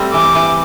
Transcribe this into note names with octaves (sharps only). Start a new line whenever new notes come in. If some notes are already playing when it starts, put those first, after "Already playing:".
Already playing: G3 A3 C4
E3 D6
E3